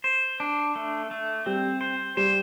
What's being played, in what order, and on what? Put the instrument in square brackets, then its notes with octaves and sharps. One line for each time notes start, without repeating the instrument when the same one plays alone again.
[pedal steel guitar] C5
D4
A3
A3
[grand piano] G3 [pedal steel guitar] C4
[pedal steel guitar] C5
[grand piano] G3 [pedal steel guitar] C5